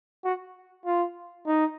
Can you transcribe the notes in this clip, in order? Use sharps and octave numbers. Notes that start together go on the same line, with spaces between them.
F#4
F4
D#4